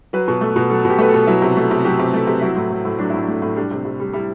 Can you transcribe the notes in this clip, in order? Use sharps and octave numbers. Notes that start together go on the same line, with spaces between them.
F#3 B4
B2
A3
B2
F#3 A4
B2
G4
A3 B4
A4
B2
F#3 E4
C3
A3
C3
F#3 G4
C3
A3
C3
F#3 E4
A2
A3
A2
F#3 D4
A2 E4
D4
A3
A2
G3 D4
C3
C3
G3
G3 E4